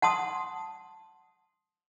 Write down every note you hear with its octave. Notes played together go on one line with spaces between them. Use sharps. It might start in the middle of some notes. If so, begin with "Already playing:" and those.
F#5 A5 C6 D#6